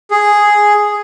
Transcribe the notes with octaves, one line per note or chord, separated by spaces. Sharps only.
G#4